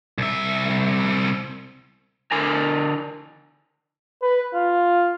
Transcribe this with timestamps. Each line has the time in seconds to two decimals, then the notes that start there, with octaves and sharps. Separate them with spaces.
0.18 C2 E5
2.32 D3 A#4 G#5
4.22 B4
4.54 F4